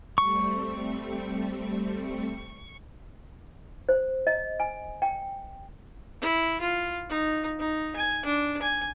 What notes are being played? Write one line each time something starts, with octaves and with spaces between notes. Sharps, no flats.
G3 A3 C4 C#6
C5
D#5
G#5
G5
E4
F4
D#4
D#4
G#5
D4
G#5